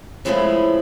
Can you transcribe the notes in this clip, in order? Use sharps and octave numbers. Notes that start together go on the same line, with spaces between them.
E3 F3 G#3 A3 C#4 E4